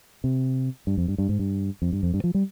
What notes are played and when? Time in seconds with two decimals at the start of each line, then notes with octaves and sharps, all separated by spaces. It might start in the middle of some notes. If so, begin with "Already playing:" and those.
0.24 C3
0.87 G2
0.97 F2
1.08 G2
1.18 G2
1.29 G#2
1.39 G2
1.82 F2
1.93 G2
2.03 F2
2.14 G2
2.24 F3
2.34 G3